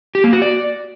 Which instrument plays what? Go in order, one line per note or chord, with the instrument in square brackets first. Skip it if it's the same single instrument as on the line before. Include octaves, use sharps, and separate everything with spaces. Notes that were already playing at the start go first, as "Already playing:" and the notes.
[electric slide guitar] G4
A#3
F#4
D5